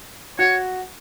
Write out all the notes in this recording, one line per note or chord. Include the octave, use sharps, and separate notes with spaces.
F#4 C#5